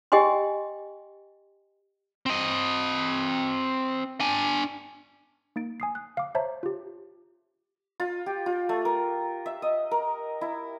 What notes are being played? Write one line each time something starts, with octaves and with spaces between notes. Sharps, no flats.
G4 D#5 G5 G#5 C6
C4 D#5
D4 G#5
A#3 D#4 A6 D7
G#5 D#6 C7
F#6
F5 D6
C5 C#5 E5 A5 A#5 G6
F4 G4
F4
G4
F4
A3
A#4
E5
D#5
A#4
E4